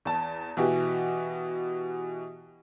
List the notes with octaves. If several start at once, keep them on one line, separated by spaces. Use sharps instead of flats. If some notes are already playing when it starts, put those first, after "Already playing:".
E2 A5
B2 E3 F#4 G4